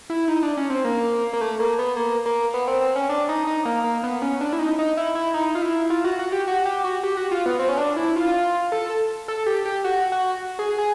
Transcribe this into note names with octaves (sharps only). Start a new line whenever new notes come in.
E4
D#4
D4
C#4
C4
A#3
A#3
A3
A#3
B3
A#3
A#3
B3
C4
C4
C#4
D4
D#4
D#4
A#3
A#3
B3
C#4
D4
E4
D#4
D#4
E4
E4
D#4
F4
E4
F4
F#4
F#4
G4
F#4
G4
F#4
G4
F#4
F4
B3
C4
C#4
D4
E4
F4
A4
A4
G4
G4
F#4
F#4
G#4
G#4